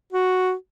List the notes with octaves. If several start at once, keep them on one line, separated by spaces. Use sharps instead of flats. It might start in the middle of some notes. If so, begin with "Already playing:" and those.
F#4